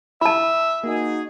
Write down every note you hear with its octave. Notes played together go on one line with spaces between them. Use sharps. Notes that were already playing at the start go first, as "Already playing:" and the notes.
E4 E5 A5 B5
A#3 D#4 F#4 G#4